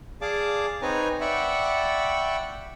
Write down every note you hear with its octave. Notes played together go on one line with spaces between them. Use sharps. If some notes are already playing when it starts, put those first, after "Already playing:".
G#4 D5 F5 A5 D6
C4 D#4 B4 C#5 G#5 A#5
D5 E5 F#5 G5 B5 C#6